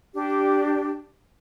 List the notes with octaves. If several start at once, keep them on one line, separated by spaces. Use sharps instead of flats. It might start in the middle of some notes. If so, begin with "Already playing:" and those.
D4 G4